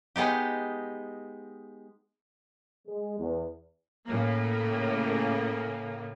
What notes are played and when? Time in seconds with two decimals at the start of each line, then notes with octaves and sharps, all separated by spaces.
0.16 G#3 B3 D#4 G4
2.86 G#3
3.19 E2
4.06 A2 C#3 A#3